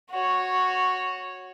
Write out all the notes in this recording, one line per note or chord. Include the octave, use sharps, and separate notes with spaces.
F#4 C#5